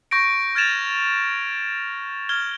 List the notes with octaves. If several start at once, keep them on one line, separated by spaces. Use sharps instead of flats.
C#6 G6 A#6 D7
F6 G#6 A6 E7 F7
F6 G#6 G7